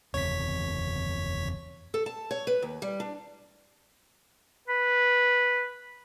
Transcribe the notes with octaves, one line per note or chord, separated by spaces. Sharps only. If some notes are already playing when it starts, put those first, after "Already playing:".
F#1 E2 C3 C#5 B6
A4
A5
C#5
B4
D#2
G3
D4
B4